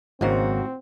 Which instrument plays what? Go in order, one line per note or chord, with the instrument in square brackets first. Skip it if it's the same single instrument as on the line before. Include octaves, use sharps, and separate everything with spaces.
[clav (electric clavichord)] G#1 C#3 A#3 [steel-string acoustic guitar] G#2 F#4 [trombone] C4